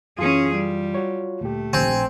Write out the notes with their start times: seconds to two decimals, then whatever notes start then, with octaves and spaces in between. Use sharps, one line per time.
0.19 F#2 E3 C#4 F4 G#4
0.55 G3
0.94 F#4 C#5
1.41 D2 A#2 A3 G4
1.73 A#1 C4 G#5